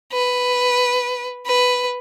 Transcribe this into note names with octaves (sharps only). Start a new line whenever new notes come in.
B4
B4